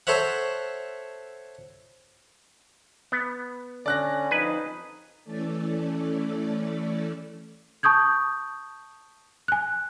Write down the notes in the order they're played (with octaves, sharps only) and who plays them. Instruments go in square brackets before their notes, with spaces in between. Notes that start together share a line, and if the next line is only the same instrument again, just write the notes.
[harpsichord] A4 C5 C#5 E5 F#5
[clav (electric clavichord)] B3
[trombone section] D3 C#4 [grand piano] D5 F#6 A#6
[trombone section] F2 D#4 [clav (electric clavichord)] B4 G#5
[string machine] E3 A3 C#4 A4 D5
[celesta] A5 C#6 D#6 G6 G#6
G#5 F#6